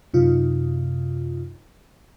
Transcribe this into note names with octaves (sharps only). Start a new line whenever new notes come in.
F#2 C3 D#4 F4